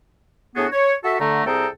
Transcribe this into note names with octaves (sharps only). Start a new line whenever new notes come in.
A2 B3 D4 F#4 G#4
C#5
F#4 A4 E5
D3 A3 A#5
C2 C4 G#4 A4 G5 A#5